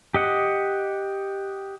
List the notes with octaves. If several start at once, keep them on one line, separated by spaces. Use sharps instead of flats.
G4 D#5 F#5